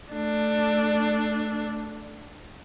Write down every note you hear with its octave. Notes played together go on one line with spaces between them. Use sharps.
A3 D4